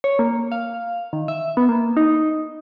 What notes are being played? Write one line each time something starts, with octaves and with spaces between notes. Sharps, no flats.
C#5
A#3
F5
D#3
E5
B3
A#3
D#4